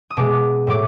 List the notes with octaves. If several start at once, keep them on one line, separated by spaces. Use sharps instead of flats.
D#6
B2 G#3 D6
A2 F#3 D6